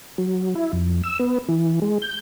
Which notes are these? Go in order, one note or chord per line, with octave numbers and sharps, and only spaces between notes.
F#3
E4
F2
E6
B3
E3
G#3
G6